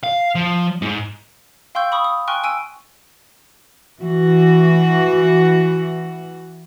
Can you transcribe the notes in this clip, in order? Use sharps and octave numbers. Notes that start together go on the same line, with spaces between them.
F5
F3
G#2
F5 G5 C6 C#6 E6 G6
B5 C#6 D#6
D#6
G5 G#5 C6 C#6 F6 F#6
G#5 E6 D7 D#7
E3 F#4